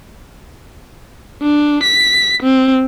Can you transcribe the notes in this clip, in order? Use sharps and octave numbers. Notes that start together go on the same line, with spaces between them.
D4
B6
C4